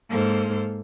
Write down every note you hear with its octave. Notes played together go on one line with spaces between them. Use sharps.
G#2 A#3 A4 C5 F6